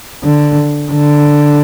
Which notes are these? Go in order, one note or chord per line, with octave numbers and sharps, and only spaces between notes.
D3
D3